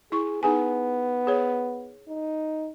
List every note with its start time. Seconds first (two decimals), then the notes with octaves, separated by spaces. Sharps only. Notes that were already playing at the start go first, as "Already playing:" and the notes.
0.12 E4 G#4 C#6
0.43 B3 D#4 G#4 G#5
1.27 G#4 C#5
2.09 D#4